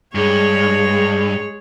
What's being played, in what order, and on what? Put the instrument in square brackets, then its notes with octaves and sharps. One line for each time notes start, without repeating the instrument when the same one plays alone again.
[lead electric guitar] G2 [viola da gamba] G#3 C#5 [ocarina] G#4